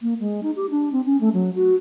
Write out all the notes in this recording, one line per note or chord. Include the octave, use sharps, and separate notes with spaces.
A#3
G#3
D#4
G4
D4
C4
C#4
A3
F#3
F#4